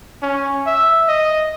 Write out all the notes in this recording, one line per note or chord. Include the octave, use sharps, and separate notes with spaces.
C#4
E5
D#5